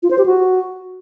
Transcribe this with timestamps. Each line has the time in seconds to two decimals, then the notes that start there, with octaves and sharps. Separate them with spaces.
0.03 F4
0.10 C5
0.18 G4
0.26 F#4